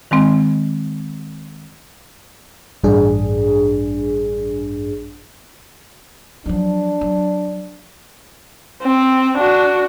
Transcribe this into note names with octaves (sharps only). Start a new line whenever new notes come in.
D#3 G#3 C4
A1 G2 D4 G#4
F3 F#3 D4
F#3
C4
D4 F#4